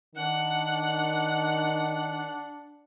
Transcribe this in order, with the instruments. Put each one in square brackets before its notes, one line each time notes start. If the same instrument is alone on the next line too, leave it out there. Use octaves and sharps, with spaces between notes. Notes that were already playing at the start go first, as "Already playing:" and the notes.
[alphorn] D#3 [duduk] D4 [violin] F#5 F#6